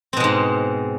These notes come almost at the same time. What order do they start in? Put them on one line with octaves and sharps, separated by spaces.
C4 B2 G#3 G#2